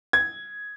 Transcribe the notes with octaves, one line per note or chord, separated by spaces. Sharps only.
G#6